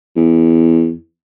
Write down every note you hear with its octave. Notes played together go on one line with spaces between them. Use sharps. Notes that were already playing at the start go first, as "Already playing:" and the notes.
E2